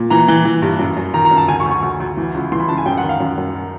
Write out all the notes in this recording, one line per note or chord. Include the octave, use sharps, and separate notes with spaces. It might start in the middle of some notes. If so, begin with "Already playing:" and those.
Already playing: A#2
E3 A#5
E3
E3
G2
F#2
F#2
D#3 A#5
A#5
F#2
A5
D2 G#5
C#6
D2
C#6
D2
D2
E3
C#2
E3 C6
B5
C#2 A5
G#5
F#2 G5
F#5
D#3
F5
F#2
F#2